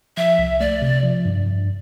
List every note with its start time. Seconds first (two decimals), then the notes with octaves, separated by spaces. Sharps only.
0.17 F3 E5
0.39 C2
0.60 A3 D5
0.82 C3
1.03 F3
1.25 G2
1.47 G2